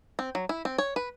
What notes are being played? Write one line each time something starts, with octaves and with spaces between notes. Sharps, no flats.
C4
F#3
E4
C4
C#5
B4